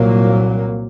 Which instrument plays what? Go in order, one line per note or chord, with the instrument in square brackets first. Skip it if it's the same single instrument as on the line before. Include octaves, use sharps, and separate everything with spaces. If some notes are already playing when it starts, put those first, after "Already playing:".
Already playing: [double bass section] C2 A#2 F#3 A#3